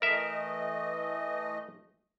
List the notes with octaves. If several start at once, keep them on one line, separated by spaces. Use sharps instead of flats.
E3 A3 A#4 D#5 E5